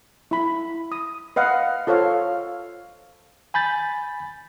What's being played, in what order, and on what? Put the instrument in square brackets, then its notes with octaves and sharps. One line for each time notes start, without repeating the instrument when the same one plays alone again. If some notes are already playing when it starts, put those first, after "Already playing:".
[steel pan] E4 B5
D#6
B4 D#5 F5 F#5
F4 A4 C5 C#5 F5
[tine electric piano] G#5 B5 G6 A6